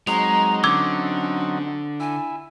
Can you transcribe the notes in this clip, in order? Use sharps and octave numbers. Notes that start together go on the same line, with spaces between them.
F#3 G#3 C4 D#4 A#5 F7
D3 C#4 D6 E6 G#6
E4 G#5